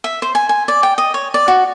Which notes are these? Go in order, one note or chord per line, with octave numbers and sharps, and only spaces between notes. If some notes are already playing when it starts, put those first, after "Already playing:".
E5
C5
G#5
G#5
D5
G5
D#5
C#5
D5
F#4